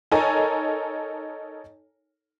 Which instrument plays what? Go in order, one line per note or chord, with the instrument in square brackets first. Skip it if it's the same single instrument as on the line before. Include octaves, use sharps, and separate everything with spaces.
[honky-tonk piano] D#4 A4 A#4 C#5 G#5 A#5